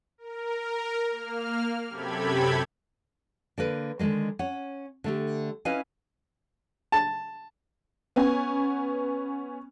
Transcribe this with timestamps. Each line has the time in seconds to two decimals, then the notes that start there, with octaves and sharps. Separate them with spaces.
0.18 A#4
1.08 A#3 F6
1.89 F#2 C3 G4 A4 B5 G#6
3.58 D3 A#3 B4
3.99 D3 D#3 F3 G#3 A#3
4.39 C#4 C#5 F#5
5.04 D3 A3 G4
5.65 C#4 E4 B4 D#5 F5 G#5
6.92 A5
8.16 B3 C#4 G#5